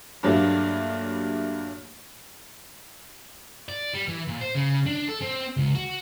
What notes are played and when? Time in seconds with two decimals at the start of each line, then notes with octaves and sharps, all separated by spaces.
0.23 G2 A#2 F#3 G3 A3 A#3
3.69 D5
3.94 G3
4.08 E3
4.28 A#2
4.41 C5
4.55 C#3
4.87 D4
5.08 A4
5.21 C4
5.57 C#2
5.75 F#4